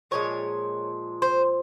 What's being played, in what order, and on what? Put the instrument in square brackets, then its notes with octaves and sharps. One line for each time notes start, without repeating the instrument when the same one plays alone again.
[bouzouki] A#2 F3 G#3 C#5
C5